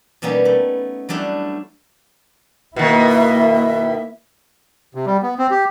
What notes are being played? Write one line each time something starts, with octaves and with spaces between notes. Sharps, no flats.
B2 G3 A#3 B3 C#4 D#4
A3
F#3 G3 A3 D4 E4
B2 D#3 A#3 E4
E5
C3
G3
B3
C4
G4